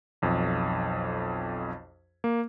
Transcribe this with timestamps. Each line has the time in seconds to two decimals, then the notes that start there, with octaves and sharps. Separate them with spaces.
0.22 B1 F2
2.24 A#3